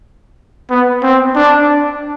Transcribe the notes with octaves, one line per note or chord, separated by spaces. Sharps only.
B3
C4
D4